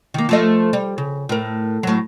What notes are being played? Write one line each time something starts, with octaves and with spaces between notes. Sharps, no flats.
D#3 A#3
F3 A3 D#5
G3
C#3
A2 A#4
A2 F#3